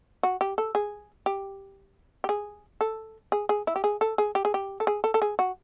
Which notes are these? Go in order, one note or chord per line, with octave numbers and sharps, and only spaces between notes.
F#4
G4
A4
G#4
G4
G4
G#4
A4
G#4
G#4
E4
G4
G#4
A4
G#4
G4
G#4
G4
A4
G#4
A4
A4
G#4
F#4